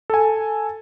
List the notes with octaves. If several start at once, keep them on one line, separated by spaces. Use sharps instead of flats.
A4 G#5